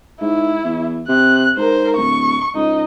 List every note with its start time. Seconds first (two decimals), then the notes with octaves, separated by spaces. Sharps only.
0.21 G#2 E4
0.64 E2
1.08 C3 F#6
1.57 G#2 A#4 C5
1.96 D1 C#6
2.55 C#2 D#4